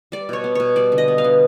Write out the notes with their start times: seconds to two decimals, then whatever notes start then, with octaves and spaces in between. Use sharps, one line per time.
0.12 G3 D5
0.29 B2 C#5
0.44 B3
0.55 B2 C#5
0.76 G3 D5
0.92 D3
0.98 D#5
1.08 B3
1.18 F5
1.24 D3